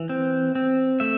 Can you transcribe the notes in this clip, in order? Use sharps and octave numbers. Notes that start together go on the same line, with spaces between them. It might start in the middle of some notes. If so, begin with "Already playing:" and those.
Already playing: E3
C4
C4
A3 E5